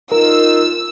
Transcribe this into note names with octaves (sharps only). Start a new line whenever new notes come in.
D#4 F4 A#4 E6